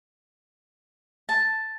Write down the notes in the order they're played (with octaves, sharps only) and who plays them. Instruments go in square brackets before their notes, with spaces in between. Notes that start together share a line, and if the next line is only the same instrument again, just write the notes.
[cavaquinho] A5